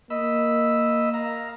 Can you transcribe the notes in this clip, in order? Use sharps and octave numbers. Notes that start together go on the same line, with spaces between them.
A#3 D#5 B5 E6
F5 A#5